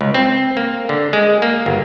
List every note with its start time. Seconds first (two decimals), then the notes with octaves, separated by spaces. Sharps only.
0.01 C#2
0.14 C4
0.57 A#3
0.89 D3
1.13 G#3
1.42 A#3
1.66 G1